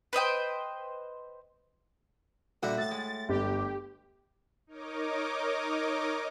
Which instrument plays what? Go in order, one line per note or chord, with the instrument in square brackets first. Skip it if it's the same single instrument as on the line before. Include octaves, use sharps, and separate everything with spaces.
[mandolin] B4 C5 D#5 G5
[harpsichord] A#2 D3 G3 [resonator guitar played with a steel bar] F#4 E5
[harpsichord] A2 [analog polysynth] A6
[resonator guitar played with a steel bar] G#3
[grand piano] G1 [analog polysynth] G4
[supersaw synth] D#4 A#4 C#5 D#5 D6